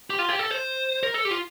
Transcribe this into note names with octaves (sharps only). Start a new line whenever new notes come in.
G4
F4
G4
A4
C5
A#4
A4
G4
F4